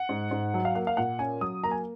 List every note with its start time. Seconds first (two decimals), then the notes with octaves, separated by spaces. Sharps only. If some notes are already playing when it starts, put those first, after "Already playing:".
Already playing: F#5
0.09 G#2
0.31 G#2
0.54 F#3
0.65 F5
0.75 A#3 F#5
0.87 F5
0.97 A#2 F#5
1.19 C#4 G#5
1.41 F#3 D#6
1.64 A#3 A#5
1.71 G#5